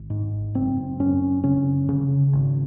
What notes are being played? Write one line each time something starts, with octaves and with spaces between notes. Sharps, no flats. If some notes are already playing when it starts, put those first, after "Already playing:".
Already playing: G#1
G#2
F#1 C4
F#2 C#4
C#3 C#4
C#3
G#1